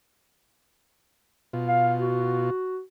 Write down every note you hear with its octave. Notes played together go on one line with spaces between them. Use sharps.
B2 F4
F5
F#4